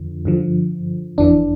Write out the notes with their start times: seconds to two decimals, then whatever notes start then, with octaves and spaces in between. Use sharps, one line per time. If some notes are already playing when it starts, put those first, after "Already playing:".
Already playing: F2 D3 F3
0.25 G2 D3 F3
1.18 G1 F2 E3 D4